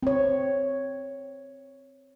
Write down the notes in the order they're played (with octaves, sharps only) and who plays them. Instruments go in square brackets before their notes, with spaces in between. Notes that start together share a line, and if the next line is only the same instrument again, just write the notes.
[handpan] C4 C#5